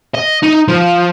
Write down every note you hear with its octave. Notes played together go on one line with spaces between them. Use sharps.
D#5
D#4
F3